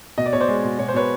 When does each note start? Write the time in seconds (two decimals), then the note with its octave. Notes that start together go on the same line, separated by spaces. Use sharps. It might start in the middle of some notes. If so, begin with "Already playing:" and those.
0.18 B2 D#5
0.26 D5
0.33 B2 C#5
0.40 C5 D5
0.48 G#3
0.64 B2
0.79 B2 C#5
0.88 C5
0.94 B2 B4 C#5